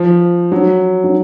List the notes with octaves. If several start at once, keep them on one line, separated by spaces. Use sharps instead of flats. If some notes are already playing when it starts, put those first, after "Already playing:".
Already playing: F3
F#3
F#3